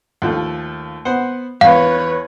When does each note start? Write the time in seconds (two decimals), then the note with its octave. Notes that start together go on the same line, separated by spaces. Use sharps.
0.22 D#2 F3 A3
1.05 B3 C5 F#5
1.61 E2 B4 C#5 F5